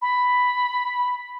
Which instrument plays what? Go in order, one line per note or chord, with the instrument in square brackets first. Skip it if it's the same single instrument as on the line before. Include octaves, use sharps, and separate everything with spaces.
[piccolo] B5